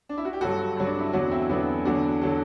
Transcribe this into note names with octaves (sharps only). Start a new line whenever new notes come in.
D4
E4
F#4
G4
G2 F#3 F#4 A4
G2 F#3
D4
E4
E2 D3 F#3 D4 F#4
C4 E4
E2 D3 F#3 B3 D4
E2 D3 F#3 D4 F#4
D3 F#3 F#4 A4